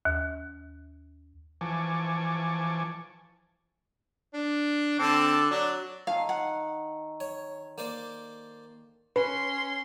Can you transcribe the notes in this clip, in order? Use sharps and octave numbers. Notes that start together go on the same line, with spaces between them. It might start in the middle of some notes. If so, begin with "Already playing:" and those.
D#2
E3 F3 G#5 A5 C#6 D6
D4
D3 C4 A5 D6
F#3 D4
D#3 A4 F5
F#5
C#5
A#3 C5 D5
C#4 B4 C6